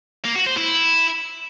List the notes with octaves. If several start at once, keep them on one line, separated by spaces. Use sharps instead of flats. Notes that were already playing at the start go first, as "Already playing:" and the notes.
A#3
F#4
C5
E4